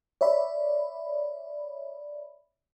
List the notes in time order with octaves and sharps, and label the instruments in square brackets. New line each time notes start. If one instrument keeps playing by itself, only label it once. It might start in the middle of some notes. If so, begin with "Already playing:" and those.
[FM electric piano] C#5 D5 E5 B5